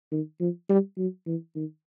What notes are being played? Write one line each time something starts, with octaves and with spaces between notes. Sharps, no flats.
D#3
F3
G3
F#3
E3
D#3